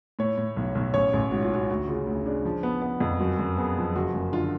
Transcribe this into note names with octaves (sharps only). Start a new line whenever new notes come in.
A2 C#5
A2
B1
B1
A1 C#5
A1
G#2 F#4
F4
G#2 F#4
D2 F#4
C#3 F4
D2
C#3 D4
F3
B3
B3
F2
F#2 F#4
F#2
B3 G#4
F3
F#1 F#4
F#2
D3 F4